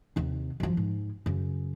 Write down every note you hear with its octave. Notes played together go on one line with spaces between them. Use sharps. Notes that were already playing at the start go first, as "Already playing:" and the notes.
D#2 C3
F#2 F3
G#2
F#2 C#3